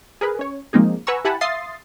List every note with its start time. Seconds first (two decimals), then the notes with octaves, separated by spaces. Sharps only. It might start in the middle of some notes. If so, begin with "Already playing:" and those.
0.21 G#4 A#4 B4
0.39 C#4 C#5
0.73 F3 G#3 A#3 C4 D#4 G#4
1.07 B4 F#5 G#5 A#5 C#6 E6
1.25 E4 G4 F#5 G#5 A5 B5
1.41 E5 F5 C6 D#6 A6 C7